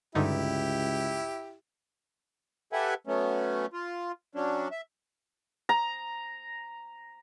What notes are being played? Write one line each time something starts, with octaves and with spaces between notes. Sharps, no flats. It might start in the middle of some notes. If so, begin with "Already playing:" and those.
C#2 G2 D3 D#4 E4 G4
G4 A4 B4 E5 F#5 G#5
F#3 A3 B3 C#4
F4
F#3 C#4 D4
E5
A#5